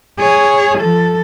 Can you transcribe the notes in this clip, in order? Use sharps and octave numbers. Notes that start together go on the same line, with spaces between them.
G#4 C#5
F3 A4